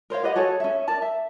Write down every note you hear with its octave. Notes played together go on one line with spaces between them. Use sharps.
A#4 C5 C#5 F5
G4 B4 D#5 F#5
F#4 G#4 A4 C#5
C#4 E5
A#4 D5 A5
E5